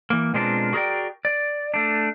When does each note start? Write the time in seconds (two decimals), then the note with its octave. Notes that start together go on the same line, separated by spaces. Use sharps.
0.10 E3 A#3
0.34 B2 G#3 C4 D4 F4 A#4
0.73 F#4 G#4 A#4 C#5 D5 G5
1.25 D5
1.74 A3 D4